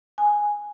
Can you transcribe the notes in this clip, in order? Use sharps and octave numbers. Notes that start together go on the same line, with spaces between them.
G#5